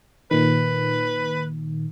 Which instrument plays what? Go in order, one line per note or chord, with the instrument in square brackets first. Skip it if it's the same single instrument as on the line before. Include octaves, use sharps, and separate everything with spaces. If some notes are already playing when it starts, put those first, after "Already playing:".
[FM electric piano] A#2 D#3 [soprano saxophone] B4